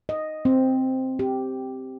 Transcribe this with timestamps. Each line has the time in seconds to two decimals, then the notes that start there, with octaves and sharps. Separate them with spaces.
0.09 D#5
0.45 C4
1.19 G4